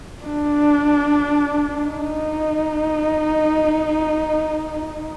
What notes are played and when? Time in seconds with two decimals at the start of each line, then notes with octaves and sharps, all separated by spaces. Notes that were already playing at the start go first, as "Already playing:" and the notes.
0.24 D4
1.84 D#4